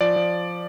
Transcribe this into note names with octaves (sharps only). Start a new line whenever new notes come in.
F3 D5
F3